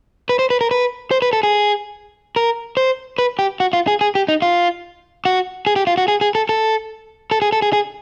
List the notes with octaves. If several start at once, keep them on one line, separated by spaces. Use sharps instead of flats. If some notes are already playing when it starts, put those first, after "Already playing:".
B4
C5
B4
A#4
B4
C5
B4
A4
G#4
A#4
C5
B4
G4
F#4
F4
G#4
G#4
G4
D#4
F4
F#4
G#4
G4
F4
F#4
G#4
G#4
A4
A4
A4
G#4
A4
G#4
G#4